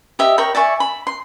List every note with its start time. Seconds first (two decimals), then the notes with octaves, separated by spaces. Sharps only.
0.19 G4 D#5 E5
0.38 A#4 C#5 G5 B5
0.55 D5 E5 G#5 C#6
0.80 B5
1.07 C6